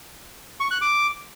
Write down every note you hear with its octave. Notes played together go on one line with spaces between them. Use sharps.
C#6
F#6
D6